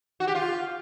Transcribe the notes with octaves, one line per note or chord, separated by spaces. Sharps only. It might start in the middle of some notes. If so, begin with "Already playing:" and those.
F#4
G4
F4